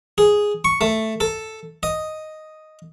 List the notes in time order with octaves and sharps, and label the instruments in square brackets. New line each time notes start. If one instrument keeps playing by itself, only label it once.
[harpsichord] G#4
C#6
A3
A4
D#5